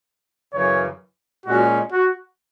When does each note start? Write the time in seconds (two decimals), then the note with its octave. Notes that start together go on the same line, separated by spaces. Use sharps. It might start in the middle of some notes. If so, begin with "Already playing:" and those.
0.53 F#2 C#3 E3 C#5
1.46 A#2 G#3 C#4 F#4
1.92 F#4